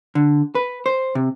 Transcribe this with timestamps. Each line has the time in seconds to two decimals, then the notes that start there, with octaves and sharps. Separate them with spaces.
0.15 D3
0.55 B4
0.86 C5
1.15 C3